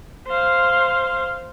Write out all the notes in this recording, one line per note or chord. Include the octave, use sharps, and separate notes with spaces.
C5 F5